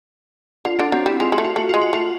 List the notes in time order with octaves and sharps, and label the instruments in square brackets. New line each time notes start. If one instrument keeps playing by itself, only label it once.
[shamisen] D3 [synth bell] F4
[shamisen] D3 [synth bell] D4
[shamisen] F#3 [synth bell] C4
[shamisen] G3 [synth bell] E4
[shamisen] G#3 [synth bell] F4
[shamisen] G#3 [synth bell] F#4
[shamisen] A3
[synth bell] F4
[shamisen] A3 [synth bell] F#4
[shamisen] G#3 [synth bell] F4
[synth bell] F#4
[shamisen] A3 [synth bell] F4